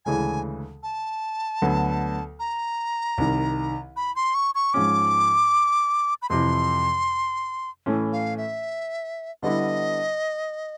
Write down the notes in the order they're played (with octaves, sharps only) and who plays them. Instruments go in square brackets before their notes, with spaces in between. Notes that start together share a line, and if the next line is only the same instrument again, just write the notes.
[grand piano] D2 C#3 E3 G#3 [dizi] G#5
[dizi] A5
[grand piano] D2 D3 F#3 B3
[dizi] A#5
[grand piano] C2 C3 D#3
[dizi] B5
C6
C#6
C#6
[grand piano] G#2 F3 G#3 C#4 [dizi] D6
[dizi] B5
[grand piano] F2 C3 E3 [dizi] C6
[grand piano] A2 E3 A3 C#4
[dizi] F5
E5
[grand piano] D3 G3 B3 E4 [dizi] D#5